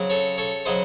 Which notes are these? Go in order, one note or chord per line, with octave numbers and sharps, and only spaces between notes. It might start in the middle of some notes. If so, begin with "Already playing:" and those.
Already playing: C#3 F#3 C4
A4 C#5
A4 C#5
C#3 F#3 C5 D#5